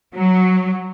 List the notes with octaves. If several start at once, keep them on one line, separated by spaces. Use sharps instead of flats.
F#3